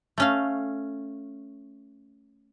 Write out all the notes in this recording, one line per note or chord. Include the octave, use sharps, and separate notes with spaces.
A3 C#4 F5